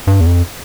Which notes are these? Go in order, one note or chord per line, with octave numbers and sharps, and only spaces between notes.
G2
E2
F2